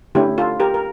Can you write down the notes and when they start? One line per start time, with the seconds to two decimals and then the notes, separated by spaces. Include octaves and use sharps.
0.15 D3 A3 C#4 E4 G4
0.38 F4 A4
0.60 G4 A#4
0.74 A#4